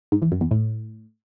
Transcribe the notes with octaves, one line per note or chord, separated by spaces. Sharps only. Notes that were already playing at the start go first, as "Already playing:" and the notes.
G#2
E2
F#2
E2
A2